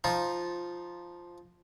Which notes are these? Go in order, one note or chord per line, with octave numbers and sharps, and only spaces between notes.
F3 D#4 F4